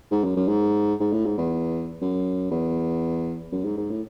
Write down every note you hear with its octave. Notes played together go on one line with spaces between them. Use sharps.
G#2
F#2
F#2
G#2
G#2
A2
G#2
E2
F#2
E2
F#2
G#2
G#2
A2